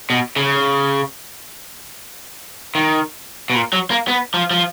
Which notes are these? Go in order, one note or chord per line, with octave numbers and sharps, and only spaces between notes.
B2
C#3
D#3
B2
A#2
F#3
A#3
B3
F3
F3